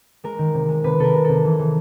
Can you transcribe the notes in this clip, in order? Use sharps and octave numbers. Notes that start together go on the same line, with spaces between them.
G#3 A#4
D#3
C3
G#3
C3 B4
C3 A4 A#4
G#3
C3 A4
E3
E3